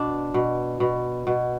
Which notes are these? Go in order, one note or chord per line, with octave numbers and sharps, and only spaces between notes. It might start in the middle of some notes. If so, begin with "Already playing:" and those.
Already playing: B2 D4
B2
B2
B2